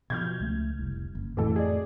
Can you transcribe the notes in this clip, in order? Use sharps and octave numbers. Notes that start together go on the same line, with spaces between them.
B2 F3 F6 G6 G#6
C#2 A3
F1 C2
F#1
F2 A2 E3 A3 A4
G#4 D5